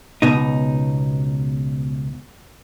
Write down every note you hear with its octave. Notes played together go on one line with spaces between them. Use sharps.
C#2 B2 D#4